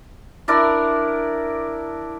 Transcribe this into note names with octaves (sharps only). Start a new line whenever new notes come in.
D4 E4 A#4 D5